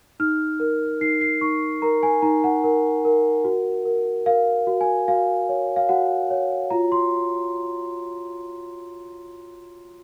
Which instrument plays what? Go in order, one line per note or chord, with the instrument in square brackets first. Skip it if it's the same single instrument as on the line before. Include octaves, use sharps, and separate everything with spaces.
[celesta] D#4 F6
A#4
D#4 C7
C7
D#4 C#6
A#4 A#5
G#5
D#4 A#5
F#5
A#4
A#4
F#4
A#4
A#4 F5
F#4
G#5
F#4 F5
C#5
F5
F#4 F#5
C#5
F4 A#5
C6